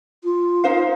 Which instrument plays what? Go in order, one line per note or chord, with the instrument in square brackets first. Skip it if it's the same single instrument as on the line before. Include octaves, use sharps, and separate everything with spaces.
[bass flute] F4
[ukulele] D#4 C5 F5